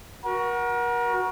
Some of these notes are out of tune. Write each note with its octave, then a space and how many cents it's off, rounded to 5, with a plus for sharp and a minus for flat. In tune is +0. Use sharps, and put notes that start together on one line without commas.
F#4 +0 A#4 +35